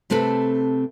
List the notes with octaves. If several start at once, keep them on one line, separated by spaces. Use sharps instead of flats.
C3 A3 C4 A4 B4